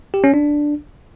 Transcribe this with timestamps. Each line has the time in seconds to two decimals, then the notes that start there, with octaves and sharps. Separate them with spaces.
0.14 G4
0.24 C#4
0.34 D4